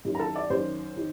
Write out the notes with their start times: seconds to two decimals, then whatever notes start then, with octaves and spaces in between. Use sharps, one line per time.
0.05 F#2 D#3
0.15 A#5
0.19 A4 A5
0.36 D5
0.50 F#2 D#3 C5
0.96 D#3